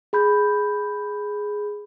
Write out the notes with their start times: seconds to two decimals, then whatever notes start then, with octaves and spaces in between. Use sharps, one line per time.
0.13 G#4 B5 G6